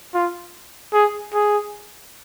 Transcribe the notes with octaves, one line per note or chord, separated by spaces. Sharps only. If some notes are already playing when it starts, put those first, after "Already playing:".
F4
G#4
G#4